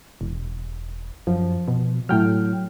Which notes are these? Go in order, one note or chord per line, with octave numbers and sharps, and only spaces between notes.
E1
F#2 F3
B2
A2 F#3 G5 F6